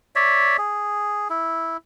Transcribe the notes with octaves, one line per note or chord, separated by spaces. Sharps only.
C#5 D5 E5
G#4
E4